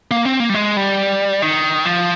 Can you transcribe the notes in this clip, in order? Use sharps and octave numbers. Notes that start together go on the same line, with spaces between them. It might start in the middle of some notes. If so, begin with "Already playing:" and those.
A#3
C4
A#3
G3
G#3
G3
D#3
F3